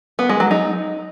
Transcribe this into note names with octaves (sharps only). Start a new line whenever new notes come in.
B3
G#3
F#3
D#4